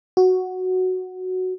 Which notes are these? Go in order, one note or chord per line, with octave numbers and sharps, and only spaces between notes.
F#4